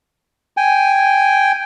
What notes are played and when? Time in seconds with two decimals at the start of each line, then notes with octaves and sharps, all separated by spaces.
0.57 G5 G#5